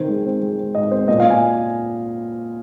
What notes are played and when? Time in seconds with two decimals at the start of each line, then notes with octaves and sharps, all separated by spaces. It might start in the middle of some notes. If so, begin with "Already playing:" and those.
Already playing: D#3 C4 C5
0.09 G#3
0.26 C4
0.42 G#3
0.59 C4
0.75 G#2 D#5
0.91 C4 C5
1.08 A#2 D#5
1.20 A#2 F5
1.30 G#5